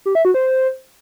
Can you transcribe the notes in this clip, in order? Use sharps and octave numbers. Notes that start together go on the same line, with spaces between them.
G4
E5
F#4
C5